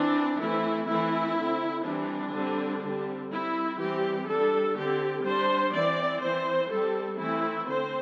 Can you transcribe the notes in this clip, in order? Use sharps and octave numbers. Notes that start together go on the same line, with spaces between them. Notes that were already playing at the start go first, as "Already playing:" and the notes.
Already playing: E3 C4 D4
E3 A3 C4 E4
E3 A3 C4 E4
D3 C4
E3 G3 C4 D4
D3 G3 C4
D3 G3 C4
G3 C4 E4
E3 G3 C4 G4
G3 D4 A4
D3 C4 G4
G3 D4 C5
E3 C4 D5
E3 C4 C5
G3 C4 A4
E3 A3 C4 E4
D3 C4 C5